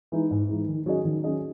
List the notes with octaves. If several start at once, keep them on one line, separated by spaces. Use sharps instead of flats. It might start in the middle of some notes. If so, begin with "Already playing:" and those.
E3 G#3 D#4
G#2
E3 G#3 D#4
D#3
F#3 C#4 G#4 D#5
D#3
F#3 C#4 G#4 D#5